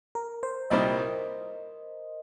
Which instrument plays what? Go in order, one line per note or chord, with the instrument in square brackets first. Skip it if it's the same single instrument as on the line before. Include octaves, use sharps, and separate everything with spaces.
[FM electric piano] A#4
C5
[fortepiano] C2 A#2 G3 D#4 C5 [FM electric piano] D#5